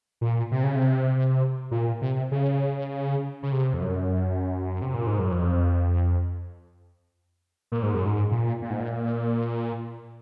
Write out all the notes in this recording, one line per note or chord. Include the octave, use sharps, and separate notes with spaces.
A#2
C3
C#3
C3
A#2
C3
C#3
C#3
C3
F2
F#2
C3
A#2
G#2
F#2
F2
A#2
G#2
F#2
G#2
A#2
A#2
G#2
A#2